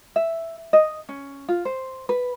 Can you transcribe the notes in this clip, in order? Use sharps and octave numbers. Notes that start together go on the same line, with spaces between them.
E5
D#5
C#4
F4
C5
B4